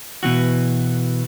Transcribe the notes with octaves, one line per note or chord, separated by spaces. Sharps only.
B2 E3 F#4